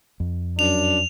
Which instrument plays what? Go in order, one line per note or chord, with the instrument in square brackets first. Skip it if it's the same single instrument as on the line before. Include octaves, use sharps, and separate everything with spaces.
[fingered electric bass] F2
[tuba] F#2 [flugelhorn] D4 [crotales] F7